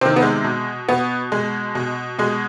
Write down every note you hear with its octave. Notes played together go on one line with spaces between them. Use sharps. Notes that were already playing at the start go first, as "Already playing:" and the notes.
C3 D#3 C4
B3
G#3
B2
B2 B3
B2 G#3
B2
B2 G#3